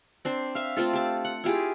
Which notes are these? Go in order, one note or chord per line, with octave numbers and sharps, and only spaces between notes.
C4 D4 C5
E5 F5
A3 C4 F4 A4
G4 A5
F#5
E4 F4 G4 G#4